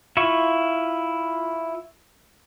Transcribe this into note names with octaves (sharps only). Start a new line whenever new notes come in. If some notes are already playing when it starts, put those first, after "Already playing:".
E4 F4 C#6